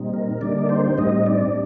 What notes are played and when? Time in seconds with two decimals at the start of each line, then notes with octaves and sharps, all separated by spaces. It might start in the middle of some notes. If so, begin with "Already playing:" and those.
Already playing: A#2 G3 C4 D#4
0.14 A#4
0.41 D3 G3 A#3 D4 D#4 D5
0.69 C4 C5
0.97 A2 G3 C4 D#4 D#5
1.26 D4 D5